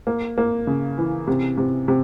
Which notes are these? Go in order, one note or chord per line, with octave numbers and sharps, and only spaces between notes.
A#3
A#3
C#3
E3
C3
C3
C3